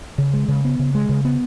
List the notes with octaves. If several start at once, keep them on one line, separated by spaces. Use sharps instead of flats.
C#3
G#3
C#3
B3
C#3
G#3
C#3
B3